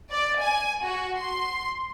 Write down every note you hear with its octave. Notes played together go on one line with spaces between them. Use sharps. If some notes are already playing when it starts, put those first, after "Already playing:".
D5
G#5
F#4
C6